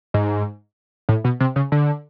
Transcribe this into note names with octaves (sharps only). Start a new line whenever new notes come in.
G#2
A2
B2
C3
C#3
D3